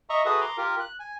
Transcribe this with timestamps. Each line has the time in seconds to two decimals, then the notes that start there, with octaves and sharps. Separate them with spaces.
0.10 D#5 E5 A#5 C#6
0.25 F#4 G#4 A4 B4 E5 D#6
0.41 A#5 C6 D6
0.57 F4 G4 A#4
0.80 F#6
1.00 G#5